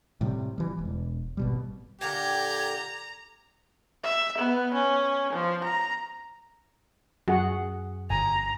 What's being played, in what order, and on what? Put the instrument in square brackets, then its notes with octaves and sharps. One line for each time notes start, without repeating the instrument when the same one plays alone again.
[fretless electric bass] A2 C3 G3
E3 G3
E1
G#1 B2 G3
[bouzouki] A#2 D3 G5 [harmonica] G4 [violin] A#5 [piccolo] G#6
[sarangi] E5
B3
C#4
F3
A#5
[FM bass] F#2 [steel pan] F#4 G#4 F#5
[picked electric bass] G1 [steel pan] G#5 [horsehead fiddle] A#5